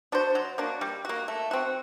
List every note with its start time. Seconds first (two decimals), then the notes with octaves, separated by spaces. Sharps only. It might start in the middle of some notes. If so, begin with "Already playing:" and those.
0.12 D4 F#4 C5
0.35 F#3
0.58 A#3 D4 F#4
0.81 G3
1.05 A#3 F#4
1.28 A3
1.51 C4 F#4